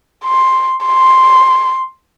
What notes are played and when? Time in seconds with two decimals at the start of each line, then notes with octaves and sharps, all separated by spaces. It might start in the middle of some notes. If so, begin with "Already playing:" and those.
0.25 C6
0.86 C6